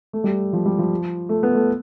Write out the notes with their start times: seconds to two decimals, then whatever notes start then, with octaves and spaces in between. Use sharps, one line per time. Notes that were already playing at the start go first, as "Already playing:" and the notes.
0.13 A3
0.24 G3
0.53 F3
0.66 G3
0.79 F3
1.29 A3
1.43 B3
1.55 A3